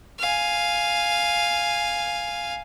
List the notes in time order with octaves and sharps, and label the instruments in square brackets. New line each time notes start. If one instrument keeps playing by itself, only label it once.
[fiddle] F5 G#5